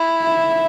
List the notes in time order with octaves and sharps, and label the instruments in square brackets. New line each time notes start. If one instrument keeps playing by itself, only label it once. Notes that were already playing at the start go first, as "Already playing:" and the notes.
Already playing: [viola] E4
[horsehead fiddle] E5